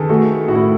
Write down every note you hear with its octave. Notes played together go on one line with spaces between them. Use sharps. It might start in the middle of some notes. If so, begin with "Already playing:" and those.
Already playing: D#3 G#4 A4 B4
A3 F#4
A2 F#4
E4